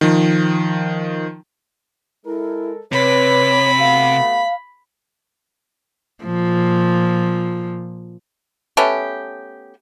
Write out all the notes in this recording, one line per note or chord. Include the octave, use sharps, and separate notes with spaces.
D#3 F3
G#3 E4 A4 A#4
C3 B4 C#5 B5
A3 B3 F#4 F5
A#2 F3
A3 B3 C#4 G4